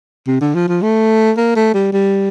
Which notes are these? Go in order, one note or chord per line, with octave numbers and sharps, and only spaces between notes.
C3
D3
F3
F3
A3
A#3
A3
G3
G3